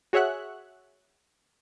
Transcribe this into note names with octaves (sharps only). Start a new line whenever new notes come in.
F#4 G#4 C#5 E5 F#5 F#6